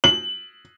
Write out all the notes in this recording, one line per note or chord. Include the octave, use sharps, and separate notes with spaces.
F#7